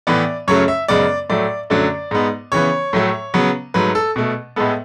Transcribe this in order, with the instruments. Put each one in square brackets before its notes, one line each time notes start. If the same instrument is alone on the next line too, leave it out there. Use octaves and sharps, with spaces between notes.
[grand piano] A2 E3 B3 D5
F#2 C#3 F#3 A3 C#5
E5
F#2 C#3 G#3 B3 D5
A2 F#3 A3 D5
F#2 D3 F#3 A3 D5
G#2 G#3 B3
C#3 E3 B3 C#5
A2 F#3 A3
C#3 F#3 B3
G#2 F#3 A3 B4
A4
B2 A3
A2 G#3 B3 A4